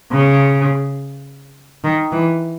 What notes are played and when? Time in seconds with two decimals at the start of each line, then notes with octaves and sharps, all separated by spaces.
0.12 C#3
1.84 D#3
2.13 E3